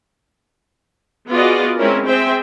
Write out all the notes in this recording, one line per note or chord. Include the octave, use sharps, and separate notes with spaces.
B3 F4 F#4 G#4 D5 D#5
G#3 C4 C#4 E4 A#4
C4 G#4 C5 E5 G5